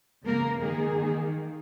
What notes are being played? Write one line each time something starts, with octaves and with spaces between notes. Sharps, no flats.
C#3 A#3 A#4
D#3 A#3 G#4
D#3 A#3